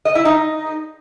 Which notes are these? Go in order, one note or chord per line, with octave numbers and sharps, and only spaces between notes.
D#5
E4
D#4